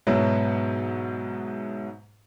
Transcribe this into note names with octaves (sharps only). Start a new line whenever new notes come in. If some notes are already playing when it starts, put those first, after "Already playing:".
G#2 B2 F#3 B3 E4